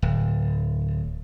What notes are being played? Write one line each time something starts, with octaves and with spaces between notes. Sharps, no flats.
D1